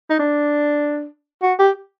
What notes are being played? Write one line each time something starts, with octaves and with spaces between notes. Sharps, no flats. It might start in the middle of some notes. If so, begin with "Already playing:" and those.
D#4
D4
F#4
G4